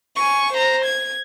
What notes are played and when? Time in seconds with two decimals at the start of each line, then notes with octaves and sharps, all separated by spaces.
0.16 G#5 C#6
0.53 C5 A#5
0.85 G#6